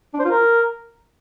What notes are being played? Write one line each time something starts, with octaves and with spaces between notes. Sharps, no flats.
D4
C5
F4
A#4